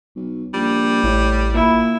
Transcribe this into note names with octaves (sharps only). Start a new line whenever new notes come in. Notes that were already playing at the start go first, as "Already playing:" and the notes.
B1
A#1 G3
A1 A2
A#2 E4